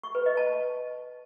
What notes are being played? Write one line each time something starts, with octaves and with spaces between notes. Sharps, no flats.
C#6
B4
D#5
A5